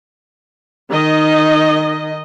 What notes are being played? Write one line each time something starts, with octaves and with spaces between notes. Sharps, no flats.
D#3 D#5